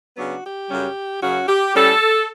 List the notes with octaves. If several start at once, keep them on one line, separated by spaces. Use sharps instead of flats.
C#3 F#3 B3 D4 F#4
G4
F#2 C#3 G3 C#4
F#2 C#3 F#3 C#4 F#4
G4
A2 G3 C#4 A4